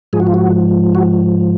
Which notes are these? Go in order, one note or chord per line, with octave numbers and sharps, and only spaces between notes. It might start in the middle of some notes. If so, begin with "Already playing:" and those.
G#2 F3 G#4
F#4
F4
F#4
F#4